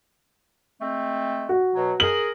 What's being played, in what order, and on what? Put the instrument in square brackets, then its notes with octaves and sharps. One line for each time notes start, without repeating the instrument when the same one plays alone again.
[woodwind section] G#3 A3 C4
[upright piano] F#4
[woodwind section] B2 F#3
[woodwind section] G#4 A#4 [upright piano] F#7